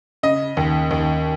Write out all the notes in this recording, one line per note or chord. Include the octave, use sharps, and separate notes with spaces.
C#3 D#5
D#2
D#2